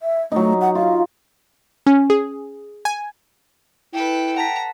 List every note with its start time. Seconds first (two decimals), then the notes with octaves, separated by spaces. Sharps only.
0.01 E5
0.32 F#3 A3 D#4
0.61 F#5
0.75 F4 F5
1.86 C#4
2.10 G#4
2.85 G#5
3.94 E4 A4 B4 G5
4.36 F#5 A5 A#5 B6